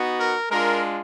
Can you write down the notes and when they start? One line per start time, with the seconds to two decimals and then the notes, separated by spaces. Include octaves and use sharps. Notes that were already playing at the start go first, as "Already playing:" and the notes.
Already playing: B3 D#4 F#4
0.18 A#4
0.50 G#3 D4 F4 A#4